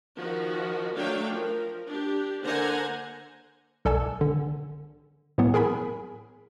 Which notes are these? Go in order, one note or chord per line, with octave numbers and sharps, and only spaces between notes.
D#3 F3 F#4
F#3 A3 D4 C#5 F5 G5
F3 A#4
D4 G4
D3 A#3 C5 F#5 G#5 A#5
B1 A4 D5 G#5 E6
D3
A2 E3 F#3 B3
G#4 A#4 G#5 B5